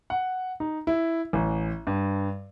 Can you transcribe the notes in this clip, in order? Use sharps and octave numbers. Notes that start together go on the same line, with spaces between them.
F#5
D#4
E4
A1
G2